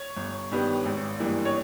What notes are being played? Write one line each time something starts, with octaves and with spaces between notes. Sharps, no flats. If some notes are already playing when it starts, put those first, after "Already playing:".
Already playing: C#5
G1
G2 D#3 G3 B3
G#1
G2 E3 A#3
C#5